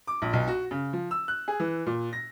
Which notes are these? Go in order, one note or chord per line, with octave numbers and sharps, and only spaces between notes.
D6
A#1
B1
F#4
C#3
F3
E6
F#6
G#4
E3
A#2
A#6